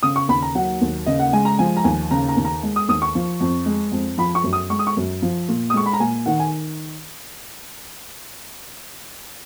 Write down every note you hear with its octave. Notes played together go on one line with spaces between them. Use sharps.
C#3 D#6
C#6
D#2 B5
A#5
F#3 F#5
D#2
C#3 D#5
F#5
G#3 G#5
A#5
F3 G#5
A#5
D#2 G#5
C#3 A#5
A#5
D#2
A#5
G#3
D#6
D#2 D#6
C#6
F3
F2
G#3
F2
F3 B5
C#6
F#2
D#6
G#3 C#6
D#6
C#6
F#2
F3
A#2
D#6
G#3 C#6
B5
A#5
A#2 G#5
D#3 F#5
G#5